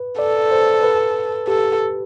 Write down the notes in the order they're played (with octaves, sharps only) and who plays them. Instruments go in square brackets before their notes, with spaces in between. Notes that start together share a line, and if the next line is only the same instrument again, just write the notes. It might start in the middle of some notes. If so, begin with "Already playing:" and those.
Already playing: [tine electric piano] B4
[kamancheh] A4 [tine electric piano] D5
[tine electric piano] C5
B4
[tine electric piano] G4 [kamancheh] A4